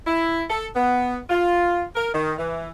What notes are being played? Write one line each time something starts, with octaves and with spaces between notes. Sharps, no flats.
E4
A4
B3
F4
A#4
D#3
E3